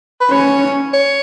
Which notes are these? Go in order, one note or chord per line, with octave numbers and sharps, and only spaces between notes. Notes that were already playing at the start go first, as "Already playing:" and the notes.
B4
C#4 C#5
C#5